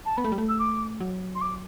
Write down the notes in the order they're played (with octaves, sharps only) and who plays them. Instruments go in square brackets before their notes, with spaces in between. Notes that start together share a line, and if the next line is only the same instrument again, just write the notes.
[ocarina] A5
[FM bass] B3 [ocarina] B5
[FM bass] A3
G3
A3
[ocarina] E6
D6
[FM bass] F#3
[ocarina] C6
D6